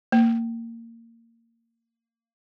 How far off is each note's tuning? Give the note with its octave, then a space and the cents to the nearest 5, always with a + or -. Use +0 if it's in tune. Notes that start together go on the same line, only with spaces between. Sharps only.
A#3 -20